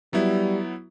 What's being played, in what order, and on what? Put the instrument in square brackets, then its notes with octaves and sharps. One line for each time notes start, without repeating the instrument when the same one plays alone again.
[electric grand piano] F#3 B3 E4 [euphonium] G3